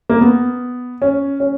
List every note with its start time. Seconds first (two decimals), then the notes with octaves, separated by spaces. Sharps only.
0.09 A#3
0.21 B3
1.02 C#4
1.40 C#4